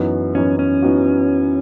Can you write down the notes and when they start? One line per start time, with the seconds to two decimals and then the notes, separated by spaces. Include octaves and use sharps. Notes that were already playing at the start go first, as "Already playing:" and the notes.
Already playing: F#2 E3 B3 D#4 F#4
0.35 F#2 E3 B3 C#4 D#4 F#4
0.59 C#4
0.82 E3 B3 D#4 F#4